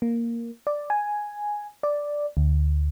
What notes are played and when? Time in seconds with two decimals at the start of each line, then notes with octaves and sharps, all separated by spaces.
0.02 A#3
0.67 D5
0.90 G#5
1.83 D5
2.37 D2